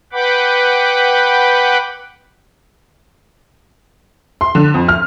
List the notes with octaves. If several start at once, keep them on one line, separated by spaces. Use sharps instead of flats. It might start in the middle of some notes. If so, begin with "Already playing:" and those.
B4 F#5 G5 B5 D6
C6
D3
F2
F6